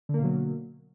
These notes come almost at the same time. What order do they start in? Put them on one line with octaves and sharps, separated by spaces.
D3 A#3 B2 F#3